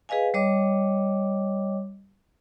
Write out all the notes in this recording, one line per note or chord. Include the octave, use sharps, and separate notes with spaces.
G#4 B4 D#5 F5 G#5
G3 C#5 D#5 D6